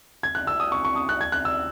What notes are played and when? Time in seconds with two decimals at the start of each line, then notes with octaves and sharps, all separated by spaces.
0.23 G#6
0.35 F#6
0.47 E6
0.60 D#6
0.72 C#6
0.85 C#6
0.96 D#6
1.09 F#6
1.21 G#6
1.32 F#6
1.45 E6